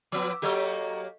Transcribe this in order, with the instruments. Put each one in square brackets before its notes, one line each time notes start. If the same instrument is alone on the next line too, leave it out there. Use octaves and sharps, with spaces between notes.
[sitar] F3 B3 [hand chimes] D6 E6
[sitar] F#3 A#3 G4 [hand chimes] A4 D#5 C#6